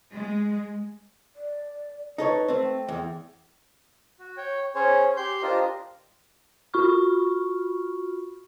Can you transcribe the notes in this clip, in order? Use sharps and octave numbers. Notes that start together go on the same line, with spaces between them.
G#3
D5
D#4 A4 B4 C#5
A3 C4
G5
E2
F#4
C#5 G5
C#4 G#4 C5 C#5
G4 C6 G6
D4 F4 G4 A#4 C5 D#5
F4 F#4 B5 C#6 F6